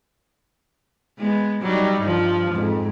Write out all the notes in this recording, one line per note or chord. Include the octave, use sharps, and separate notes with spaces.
G#3 B3
F#3 G3 D#4
G2 F3
F2 G#2